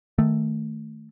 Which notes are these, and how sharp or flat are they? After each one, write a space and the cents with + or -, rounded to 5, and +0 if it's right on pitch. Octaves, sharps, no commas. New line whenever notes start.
D#3 +0 A3 +0